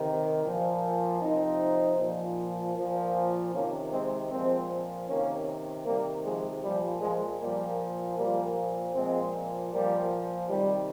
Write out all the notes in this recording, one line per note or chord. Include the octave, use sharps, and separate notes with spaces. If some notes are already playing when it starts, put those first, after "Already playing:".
Already playing: C3 D#3
A#2 F3
C3 F3 C4 D#4
A#2 F3
A#2 F3
C3 D#3 A#3 C#4
G#3 C4
A#2 F3 G#3 C4
C3 D#3 A#3 C#4
C3 D#3 G3 A#3
F3 G#3
A#2 F3 G3
F3 G#3
A#2 F3 G3 A#3
A#2 F3 G3 A#3
A#2 F3 G#3 C4
A#2 F3 G3 A#3
C3 D#3 G3